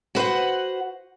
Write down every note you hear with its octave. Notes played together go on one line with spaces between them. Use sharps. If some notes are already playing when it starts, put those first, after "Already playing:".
F#4 B4 C5 F#5